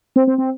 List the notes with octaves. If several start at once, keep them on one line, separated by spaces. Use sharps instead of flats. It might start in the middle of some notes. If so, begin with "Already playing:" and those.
C4
C4
C4